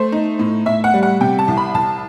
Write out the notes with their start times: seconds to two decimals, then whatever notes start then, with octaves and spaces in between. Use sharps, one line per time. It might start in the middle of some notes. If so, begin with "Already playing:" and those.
Already playing: A3 C5
0.12 D#4
0.39 A2
0.66 A2 E5
0.84 F#5
0.94 G3
1.03 F#5
1.20 C3 G5
1.39 A5
1.48 C2
1.57 B5
1.74 C2 A5